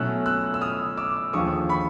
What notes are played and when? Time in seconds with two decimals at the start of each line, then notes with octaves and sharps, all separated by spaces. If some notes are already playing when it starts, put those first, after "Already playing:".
Already playing: B2 F#3 A3 C#4 E4 E6 F#6
0.26 E6 F#6
0.54 E6
0.61 D#6 F6
0.97 D6 E6
1.33 D#2 D3 F3 G#3 C#6 D#6
1.69 B5 C#6